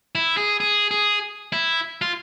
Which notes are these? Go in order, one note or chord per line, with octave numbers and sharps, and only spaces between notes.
E4
G#4
G#4
G#4
E4
F4